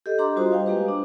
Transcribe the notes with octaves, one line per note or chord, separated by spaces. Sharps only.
G4 A4 D#5
D4 G4 D#5 A#5 C6 D6
G3 F4 F#4 C5 D#6
F5 G5
G#3 A#3 G4 B4
D4